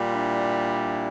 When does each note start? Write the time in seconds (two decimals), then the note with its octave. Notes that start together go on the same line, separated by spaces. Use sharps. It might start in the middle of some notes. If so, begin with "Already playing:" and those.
Already playing: A#2 G3
0.12 D4 E4